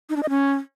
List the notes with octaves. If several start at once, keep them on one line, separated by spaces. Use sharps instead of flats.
D#4
D4
D#5
C#4